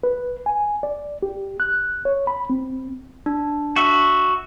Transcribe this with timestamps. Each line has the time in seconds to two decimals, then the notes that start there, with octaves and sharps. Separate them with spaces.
0.03 B4
0.46 G#5
0.83 D5
1.23 G4
1.60 F#6
2.05 C#5
2.27 B5
2.50 C4
3.26 D4
3.76 F#4 E5